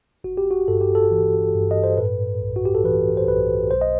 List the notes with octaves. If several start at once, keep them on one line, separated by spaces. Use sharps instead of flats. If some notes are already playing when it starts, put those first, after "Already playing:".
G1 F#4
G4
F#4
G2 A4
G4
A4
E3
G2
D#5
C5
A2 B4
B1
F#4
G4
A4
E3 B4
C5
B1 B4
B1 C5
D#5